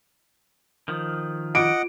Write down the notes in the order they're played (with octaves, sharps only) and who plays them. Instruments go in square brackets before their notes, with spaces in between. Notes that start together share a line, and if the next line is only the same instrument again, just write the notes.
[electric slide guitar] D#3 F3
[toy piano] F4 B4 D6 [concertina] D#5 F#5 [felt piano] D7